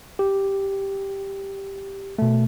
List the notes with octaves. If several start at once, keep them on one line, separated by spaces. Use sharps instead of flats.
G4
B2 A3